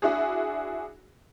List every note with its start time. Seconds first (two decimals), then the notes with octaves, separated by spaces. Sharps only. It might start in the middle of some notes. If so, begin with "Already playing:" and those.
0.02 D4 E4 F#4 G#4